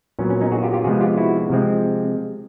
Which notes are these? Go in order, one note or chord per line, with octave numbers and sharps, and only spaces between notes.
A#2 F#3 B3 C#4
C#4
C#4 D#4
F#4 G#4
F4 G4
F4 G4
C3 F3 G#3 B3 F#4 G#4
F4 G4
E4 F#4
C3 F3 G#3 C4